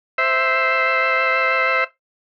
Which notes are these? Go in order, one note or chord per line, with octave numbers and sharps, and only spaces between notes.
C5 E5